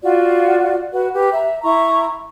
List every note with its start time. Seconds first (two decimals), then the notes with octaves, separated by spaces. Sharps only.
0.03 F4 F#4 D5
0.92 F#4 B4
1.14 G4 B4
1.34 E5 A#5
1.62 E4 A#5 C#6